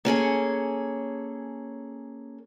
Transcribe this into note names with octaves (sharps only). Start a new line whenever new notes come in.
A#3 C#4 G#4 A4